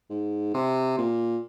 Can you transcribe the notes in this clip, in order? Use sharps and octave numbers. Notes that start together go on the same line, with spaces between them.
G#2
C3
A#2